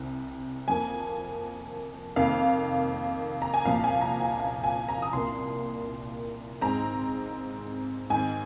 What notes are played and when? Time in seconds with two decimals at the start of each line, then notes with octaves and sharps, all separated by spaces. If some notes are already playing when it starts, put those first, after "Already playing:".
Already playing: C2 C3 C4
0.68 F2 F3 A#3 G#5
2.16 F2 C3 D#3 A#3 F5
3.42 A#5
3.54 G#5
3.65 C2 A#2 F3 F5
3.84 G#5
4.01 A#5
4.21 G#5
4.40 F5
4.64 G#5
4.89 A#5
5.02 D#6
5.13 C2 A#2 A#3 C6
6.61 G#2 G#3 C4 A#5
8.10 G#2 D#3 C4 G#5